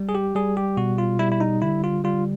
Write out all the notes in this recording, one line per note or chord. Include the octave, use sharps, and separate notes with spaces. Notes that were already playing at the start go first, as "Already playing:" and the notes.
Already playing: G3
G#4
G4
G3 G#4
G4
B2 F#4
F4
G3 E4
E4
D#4
D3 E4
F4
G3 F4